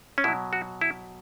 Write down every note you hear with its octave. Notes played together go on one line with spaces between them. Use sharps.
C#4
B2 F#3 E4
F#4
E4